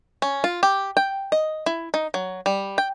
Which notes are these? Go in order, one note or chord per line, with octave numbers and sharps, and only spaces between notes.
C#4
F4
G4
G5
D#5
E4
D#4
F#3
G3
G5